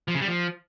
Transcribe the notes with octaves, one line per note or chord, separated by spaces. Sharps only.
F3
C#3
G3
F3